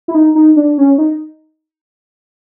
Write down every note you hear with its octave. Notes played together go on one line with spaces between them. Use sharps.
E4
D#4
D#4
D4
C#4
D#4